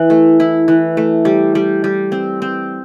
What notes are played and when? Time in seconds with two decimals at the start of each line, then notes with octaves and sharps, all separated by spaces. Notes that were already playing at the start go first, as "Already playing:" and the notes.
Already playing: E3
0.10 A3
0.40 E4
0.68 E3
0.97 A3
1.25 G3
1.55 G3
1.84 G3
2.12 C4
2.42 C4